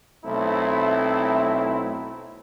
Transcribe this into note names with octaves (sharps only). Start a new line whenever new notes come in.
B1 A3 C4 E4